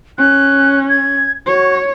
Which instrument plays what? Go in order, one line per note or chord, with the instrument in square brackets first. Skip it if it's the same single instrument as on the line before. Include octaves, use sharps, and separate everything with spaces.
[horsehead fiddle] C#4 [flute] F#6
[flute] G#6
[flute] F#4 [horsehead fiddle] C#5